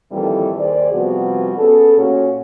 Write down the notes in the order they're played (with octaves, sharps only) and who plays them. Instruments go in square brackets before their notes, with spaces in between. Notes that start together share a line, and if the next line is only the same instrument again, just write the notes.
[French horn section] F2 A#2 D#3 E3 G3 A4
D#2 D#3 G#4 C5 D5
C3 F3 G3 B3 F#4
B3 C#4 G#4 A4
A#2 C#4 F#4